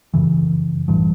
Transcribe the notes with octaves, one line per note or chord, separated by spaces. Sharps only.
F#2 C#3 E3
A1 G2 E3